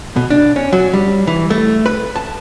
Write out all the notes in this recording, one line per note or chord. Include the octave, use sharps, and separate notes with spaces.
B2
D4
C#4
F#3
G3
E3
A3
B4
A5